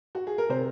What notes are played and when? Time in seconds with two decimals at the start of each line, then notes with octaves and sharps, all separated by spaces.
0.15 F#4
0.27 G#4
0.38 A#4
0.50 C3 C5